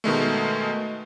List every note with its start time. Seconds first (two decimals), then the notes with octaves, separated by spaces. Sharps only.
0.04 B2 D#3 G#3 A3